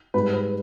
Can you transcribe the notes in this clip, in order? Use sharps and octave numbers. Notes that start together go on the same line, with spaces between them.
G#2 G3 B4
B4